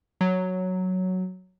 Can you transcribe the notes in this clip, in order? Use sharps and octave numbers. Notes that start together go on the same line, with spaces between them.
F#3